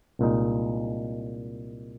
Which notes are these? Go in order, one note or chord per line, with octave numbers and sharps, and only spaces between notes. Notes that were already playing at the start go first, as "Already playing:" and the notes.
C2 A#2 G#3 D#4